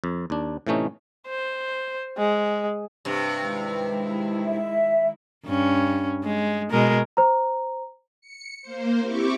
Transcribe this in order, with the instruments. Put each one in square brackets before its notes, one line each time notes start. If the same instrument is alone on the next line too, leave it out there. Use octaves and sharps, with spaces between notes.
[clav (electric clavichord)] F2
D#2 D4
A2 C3 E3 A3 C#4 D#4
[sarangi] C5
G#3
[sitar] G2 C3
[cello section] D#3 G#3 E4
[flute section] E5
[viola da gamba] G2 C#4
G#3
B2 G#3 A#4
[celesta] C5 A#5
[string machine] C#7
A#3 C5
C4 E4 G4 C#6 D6